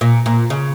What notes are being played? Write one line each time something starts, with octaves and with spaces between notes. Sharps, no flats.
A#2
A#2
C#3